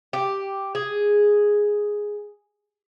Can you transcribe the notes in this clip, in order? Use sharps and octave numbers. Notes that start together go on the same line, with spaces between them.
G4
G#4